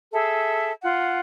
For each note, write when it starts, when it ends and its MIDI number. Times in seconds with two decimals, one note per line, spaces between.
0.12 0.71 68
0.12 0.71 69
0.12 0.71 76
0.83 1.20 65
0.83 1.20 78